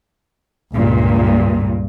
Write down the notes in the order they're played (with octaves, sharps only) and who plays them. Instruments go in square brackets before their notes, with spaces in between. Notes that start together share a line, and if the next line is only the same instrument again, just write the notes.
[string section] C#2 G2 A#2